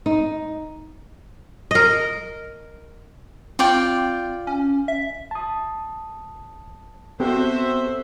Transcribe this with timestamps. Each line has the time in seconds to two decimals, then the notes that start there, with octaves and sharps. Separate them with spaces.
0.06 D#4
1.71 A#4 D#5
3.59 C4 F4 D5 G5
4.47 C#4
4.88 E5
5.31 A5 D#6
7.20 B3 C4 F#4 G4 A4 C5 E5